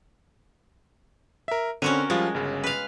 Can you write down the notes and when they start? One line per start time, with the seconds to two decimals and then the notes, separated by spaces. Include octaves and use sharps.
1.48 A#4 E5
1.82 D3 C4 C#4 F#4 A#4 D#7
2.10 F3 G3 G#3 F4
2.34 G1 C#3
2.64 B4 F5